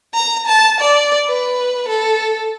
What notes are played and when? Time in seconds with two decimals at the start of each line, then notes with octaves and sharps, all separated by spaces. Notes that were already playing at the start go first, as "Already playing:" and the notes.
0.14 A#5
0.47 A5
0.81 D5
1.28 B4
1.89 A4